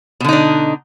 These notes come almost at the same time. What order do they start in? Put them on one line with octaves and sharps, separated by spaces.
B2 D3 D#4 D4